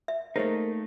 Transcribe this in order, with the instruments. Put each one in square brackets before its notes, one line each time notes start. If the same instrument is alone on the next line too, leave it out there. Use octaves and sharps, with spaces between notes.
[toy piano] E5
[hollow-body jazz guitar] A3 A#3 D#4 [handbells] G#4 C5 C#5 [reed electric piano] A#4